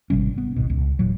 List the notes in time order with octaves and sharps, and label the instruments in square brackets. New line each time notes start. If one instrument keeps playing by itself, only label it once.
[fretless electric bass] G#1 C3 G3 C#4
B3
G#1 C#2 G#2 B2
C#2
E1 A#2 F#3